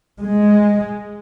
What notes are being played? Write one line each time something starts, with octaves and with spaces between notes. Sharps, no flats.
G#3